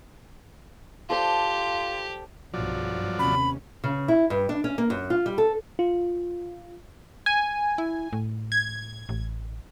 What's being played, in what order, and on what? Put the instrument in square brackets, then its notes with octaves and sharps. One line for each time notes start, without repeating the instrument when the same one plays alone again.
[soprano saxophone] F4 [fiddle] G4 [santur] A4 C5 D5
[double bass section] B1 G2 [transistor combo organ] F3 F#3 D5
[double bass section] D#2 C3 C#4 [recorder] B5
[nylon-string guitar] C#3
E4
G2
D4
C#4
A#3
F#2
F4
G3
A4
[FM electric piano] F4
[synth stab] G#5
[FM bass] E4
A2
[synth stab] G#6
[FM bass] A1